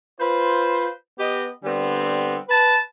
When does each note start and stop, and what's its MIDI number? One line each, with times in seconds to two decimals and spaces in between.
0.19 0.88 65
0.19 0.88 71
0.19 0.88 72
1.18 1.47 59
1.18 1.47 67
1.18 1.47 75
1.64 2.37 50
1.64 2.37 55
1.64 2.37 59
1.64 2.37 60
2.48 2.78 71
2.48 2.78 81